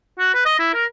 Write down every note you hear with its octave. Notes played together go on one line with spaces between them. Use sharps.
F#4
B4
D#5
E4
A#4